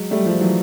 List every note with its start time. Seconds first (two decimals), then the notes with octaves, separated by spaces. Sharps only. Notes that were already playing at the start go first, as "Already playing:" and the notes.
Already playing: F#3 G#3
0.11 G3 A3
0.26 F3 G3
0.41 E3 F#3